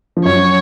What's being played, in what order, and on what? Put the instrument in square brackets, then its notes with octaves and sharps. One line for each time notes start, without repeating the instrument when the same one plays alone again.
[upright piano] F3
[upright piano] F#2 F#3 [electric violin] C#5